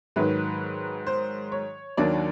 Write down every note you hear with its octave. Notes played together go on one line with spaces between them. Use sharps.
G#2 D#3 F#3 B4
C5
C#5
D#2 D#3 F#3 A#3 D4 D5